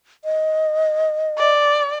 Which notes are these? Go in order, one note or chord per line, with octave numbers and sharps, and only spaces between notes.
D#5
D5